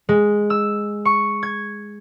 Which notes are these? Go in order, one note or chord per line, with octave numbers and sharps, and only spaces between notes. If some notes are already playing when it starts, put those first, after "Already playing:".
G#3
E6
C#6
G#6